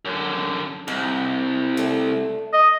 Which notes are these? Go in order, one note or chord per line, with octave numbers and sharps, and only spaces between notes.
F#2 D3
C2 G#3
A3 D4
D#5